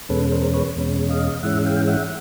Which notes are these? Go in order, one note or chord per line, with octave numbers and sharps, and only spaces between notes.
E2 B2 G#3 C#4 A4 B4
A#4 C5
B4 C#5
E2 B2 G#3 C#4
D#5 F5
G#2 E3 G#3 C#4 E5 F#5
F5 G5
E5 F#5